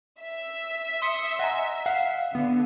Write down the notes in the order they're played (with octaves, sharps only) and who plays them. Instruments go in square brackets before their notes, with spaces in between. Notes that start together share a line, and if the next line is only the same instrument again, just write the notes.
[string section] E5
[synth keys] C6 D#6 C#7
[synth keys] D#5 G#5 [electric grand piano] F#5 A#5
[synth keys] F5 [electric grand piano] F#5
[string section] D3 [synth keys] B3